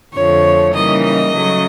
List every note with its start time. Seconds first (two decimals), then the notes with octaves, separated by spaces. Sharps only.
0.13 F2 D3 F3 A3 C#5
0.74 C#3 E3 G3 A#3 D#4 D#5
1.04 D#5
1.34 C#3 F#3 A3